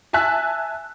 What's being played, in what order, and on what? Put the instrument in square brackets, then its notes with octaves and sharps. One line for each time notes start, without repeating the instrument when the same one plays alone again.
[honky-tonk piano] E5 G#5 A5 E6 F#6 B6